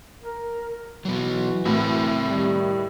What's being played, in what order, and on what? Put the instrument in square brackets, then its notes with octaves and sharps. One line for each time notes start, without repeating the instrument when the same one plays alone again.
[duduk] A#4
[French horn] E3 [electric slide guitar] F#3 B3 [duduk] F#4
[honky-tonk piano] A2 [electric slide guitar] C4 A#4 E5
[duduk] D#3 [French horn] G3